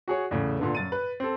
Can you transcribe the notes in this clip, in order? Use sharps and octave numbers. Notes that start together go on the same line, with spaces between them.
F#4 G#4 C#5
E2 A2 C#3
A#2 D3 B3
F#2 A6 D#7
B4
C4 A4